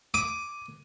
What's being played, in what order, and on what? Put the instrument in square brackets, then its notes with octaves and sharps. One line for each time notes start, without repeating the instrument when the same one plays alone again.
[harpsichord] D6 [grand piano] D#7